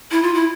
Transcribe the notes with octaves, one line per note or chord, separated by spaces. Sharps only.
E4
F4
E4